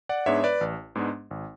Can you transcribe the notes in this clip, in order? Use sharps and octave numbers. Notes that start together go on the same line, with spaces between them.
D5 F#5
G#2 G#3 B3 D4 C#5 E5
B4 D5
A1
G#2 G#3 B3 D4
G#1